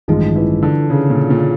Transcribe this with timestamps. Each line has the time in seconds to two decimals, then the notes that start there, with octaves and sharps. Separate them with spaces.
0.08 A1 G2 D#3 F3 G#3
0.35 E3
0.63 D3
0.90 C#3
1.10 A#2
1.30 A#2